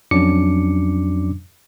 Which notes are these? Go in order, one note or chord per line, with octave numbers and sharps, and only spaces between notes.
F2 F#3 C#4 D4 D6 C#7